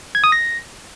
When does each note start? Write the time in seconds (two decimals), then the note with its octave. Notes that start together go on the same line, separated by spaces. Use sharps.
0.15 G#6
0.24 D#6
0.32 A#6